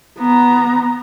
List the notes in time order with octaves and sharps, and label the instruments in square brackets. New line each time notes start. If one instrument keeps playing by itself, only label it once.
[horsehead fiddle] B3 A#5